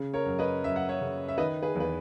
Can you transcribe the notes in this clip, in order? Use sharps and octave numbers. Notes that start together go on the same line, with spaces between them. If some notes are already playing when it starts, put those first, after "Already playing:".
Already playing: C#3
A#4 C#5
F#2
B4 D#5
F#2 E5
F#5
C#5 E5
C#3
E5
D#3 B4 D#5
G#4 B4
E2 B4